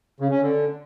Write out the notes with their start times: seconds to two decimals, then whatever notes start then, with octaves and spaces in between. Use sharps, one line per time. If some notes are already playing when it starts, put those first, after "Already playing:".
0.20 C#3
0.31 C#4
0.41 D3